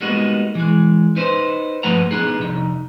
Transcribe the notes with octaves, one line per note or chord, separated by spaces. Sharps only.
G3 G#3 A#3 B3 D#4 F#4
E3 G#3
D#4 B4 C5
G2 F3 A3 B4 F#5 A#5
B3 D4 D#4 G#4
C2 F2 D#4